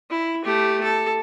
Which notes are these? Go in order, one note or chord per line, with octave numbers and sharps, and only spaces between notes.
E4
A3 G4
A4